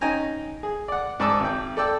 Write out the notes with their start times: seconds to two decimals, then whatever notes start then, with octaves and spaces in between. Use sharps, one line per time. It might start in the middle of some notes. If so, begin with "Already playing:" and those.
0.01 C#4 D#4 G5 G#5 A#5
0.63 G#4
0.88 D5 F#5
1.20 G#2 D5 A5 D6 E6
1.40 G#1 G5
1.77 A4 D5 G5 E6